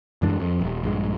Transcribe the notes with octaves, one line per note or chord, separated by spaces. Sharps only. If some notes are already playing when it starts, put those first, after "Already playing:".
F#2 E3 G#3 D4
F2
D#1
A#1 G2 G#3